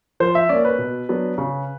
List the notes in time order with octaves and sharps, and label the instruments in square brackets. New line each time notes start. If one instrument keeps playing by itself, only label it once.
[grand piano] F3 C5
E5
A#3 C#4 D5
B4
B2
F#3 B3 D4
C#3